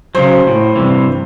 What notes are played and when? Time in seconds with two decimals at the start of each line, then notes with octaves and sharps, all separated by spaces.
0.15 C#3 F#3 C5
0.47 A2
0.76 G2 C3 E3